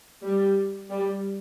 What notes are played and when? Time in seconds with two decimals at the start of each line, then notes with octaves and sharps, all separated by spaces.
0.23 G3
0.89 G3